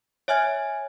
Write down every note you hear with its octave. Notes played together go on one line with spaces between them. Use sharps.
C#5 E5 G#5 F6 G#6